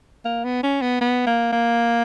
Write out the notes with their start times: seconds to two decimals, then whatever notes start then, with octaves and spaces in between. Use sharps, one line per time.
0.25 A#3
0.44 B3
0.63 C#4
0.82 B3
1.01 B3
1.27 A#3
1.52 A#3